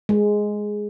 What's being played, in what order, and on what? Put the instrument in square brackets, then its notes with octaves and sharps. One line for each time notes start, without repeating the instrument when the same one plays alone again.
[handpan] G#3